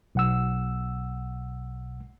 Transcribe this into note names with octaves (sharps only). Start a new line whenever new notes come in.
B1 F#5 E6